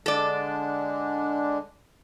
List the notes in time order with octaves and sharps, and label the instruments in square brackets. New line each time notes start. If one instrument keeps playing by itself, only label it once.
[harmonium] D3 G#3 D4 [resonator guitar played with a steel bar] A4 D5